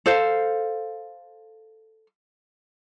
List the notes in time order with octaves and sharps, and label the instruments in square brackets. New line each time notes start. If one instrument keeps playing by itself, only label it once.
[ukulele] A4 C5 F5